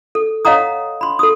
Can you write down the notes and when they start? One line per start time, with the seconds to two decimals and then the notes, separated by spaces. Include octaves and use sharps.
0.15 A4
0.45 C#5 D#5 F5 F#5 A#5 D#6
1.01 B5 C6
1.19 A4 D#6